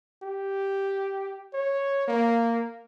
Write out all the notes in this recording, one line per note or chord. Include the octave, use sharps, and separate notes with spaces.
G4
C#5
A#3